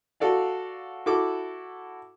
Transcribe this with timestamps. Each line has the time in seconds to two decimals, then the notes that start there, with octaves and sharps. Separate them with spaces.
0.20 F#4 A4 D5 F5
1.06 E4 F#4 A4 D6